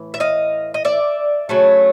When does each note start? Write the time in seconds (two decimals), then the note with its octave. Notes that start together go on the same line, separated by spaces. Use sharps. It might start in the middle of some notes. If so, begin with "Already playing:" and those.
Already playing: A2 E3
0.14 E5
0.20 D#5 F5
0.74 D#5
0.85 D5 E5
1.49 C#3 F#3 A3